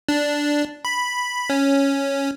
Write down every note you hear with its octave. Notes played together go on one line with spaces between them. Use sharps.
D4
B5
C#4